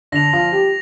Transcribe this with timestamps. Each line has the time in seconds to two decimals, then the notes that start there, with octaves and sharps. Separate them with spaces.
0.12 D3 D4 A#6 F7
0.33 F3 F4
0.52 G3 G4